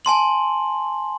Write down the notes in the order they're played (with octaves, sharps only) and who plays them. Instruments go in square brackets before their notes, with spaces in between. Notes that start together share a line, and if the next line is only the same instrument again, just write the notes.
[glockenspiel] G#5 A5 C6 F#7